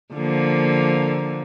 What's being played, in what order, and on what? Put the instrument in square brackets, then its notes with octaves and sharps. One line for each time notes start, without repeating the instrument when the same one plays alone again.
[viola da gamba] D3 F3 A#3